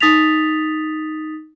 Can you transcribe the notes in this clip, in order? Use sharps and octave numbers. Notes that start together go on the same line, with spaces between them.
D#4 D#6 A6 B6 F7